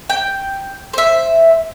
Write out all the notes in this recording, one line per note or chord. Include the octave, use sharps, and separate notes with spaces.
G5
C5 E5